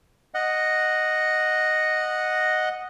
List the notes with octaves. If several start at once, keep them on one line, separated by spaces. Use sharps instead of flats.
D#5 F#5